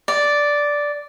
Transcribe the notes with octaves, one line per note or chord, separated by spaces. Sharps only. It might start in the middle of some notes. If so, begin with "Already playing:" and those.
D5